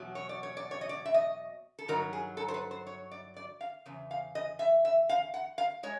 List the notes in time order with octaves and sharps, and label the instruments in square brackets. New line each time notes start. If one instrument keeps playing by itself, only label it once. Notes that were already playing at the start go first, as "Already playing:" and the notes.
Already playing: [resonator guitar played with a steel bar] E2 B2 F#3
C#5
D5
C#5
D5
C#5
D#5
D5
E5
D#5
A4
G2 D#3 F#3 A#4
G#4
A4
C5
B4
C5
C#5
D5
D5
F5
E2 C#3
F5
D#5
E5
E5
F5
F#5
F5
G#3 C#5